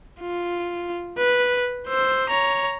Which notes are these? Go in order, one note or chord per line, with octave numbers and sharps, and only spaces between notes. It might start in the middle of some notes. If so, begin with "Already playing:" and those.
F4
B4
C5 E6
C#5 A#5